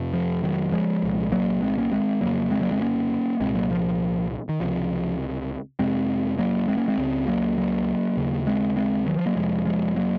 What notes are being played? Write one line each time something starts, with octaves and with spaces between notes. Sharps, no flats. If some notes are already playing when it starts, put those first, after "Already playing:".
Already playing: F2 C3
F3
D#3 F#3
F3 G#3
C2 A#2
F#3 A#3
G#3 C4
A#3 C#4
G#3 C4
F2 C#3 F#3 A#3
G#3 C4
F#3 A#3
G#3 C4
A#3 C#4
C2 A#2 G#3 C4
F#3 A#3
F3
D#3
C#2 C3 F3
F2 C3 G#3 C4
F#3 A#3
G#3 C4
A#3 C#4
G#3 C4
C#2 C#3
F#3 A#3
F#3 A#3
D#2 C#3
G#3 C4
G#3 C4
D#3 F#3
F3
F#3 A#3
F2 C3 F3 G#3
F3 G#3
F#3 A#3